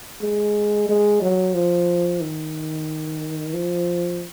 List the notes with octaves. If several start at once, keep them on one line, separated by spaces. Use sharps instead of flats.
G#3
G#3
F#3
F3
D#3
F3